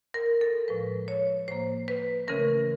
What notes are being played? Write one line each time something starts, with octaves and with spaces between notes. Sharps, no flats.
A#4
A4
A2 F3 G#3 B4
C#5
A2 F3 A#3 C5
B4
C#3 E3 A3 C#4 A#4